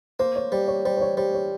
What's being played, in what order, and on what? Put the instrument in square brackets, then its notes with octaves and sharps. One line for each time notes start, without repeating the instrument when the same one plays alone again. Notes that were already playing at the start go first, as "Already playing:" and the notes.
[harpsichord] A#3 [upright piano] C5
[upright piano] C#5
[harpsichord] G3 [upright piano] C5
[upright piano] C#5
[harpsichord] G3 [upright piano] C5
[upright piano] C5
C#5
[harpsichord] G3 [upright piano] C5
[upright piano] C#5